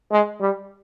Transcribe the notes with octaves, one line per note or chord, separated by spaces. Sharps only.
G#3
G3